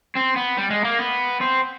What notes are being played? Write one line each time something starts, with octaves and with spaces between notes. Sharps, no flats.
C4
B3
G3
G#3
A#3
B3
C4